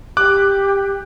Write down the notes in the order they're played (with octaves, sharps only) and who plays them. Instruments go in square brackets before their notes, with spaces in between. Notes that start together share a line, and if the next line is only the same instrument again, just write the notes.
[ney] G4 [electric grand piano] D6 F#6